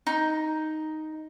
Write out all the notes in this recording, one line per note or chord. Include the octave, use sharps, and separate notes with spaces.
D#4